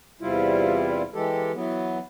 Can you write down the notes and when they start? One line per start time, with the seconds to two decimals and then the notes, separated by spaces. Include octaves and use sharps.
0.21 E2 C3 G3 E4 F4
1.14 E3 G#3 G4 A4
1.54 E3 F#3 B3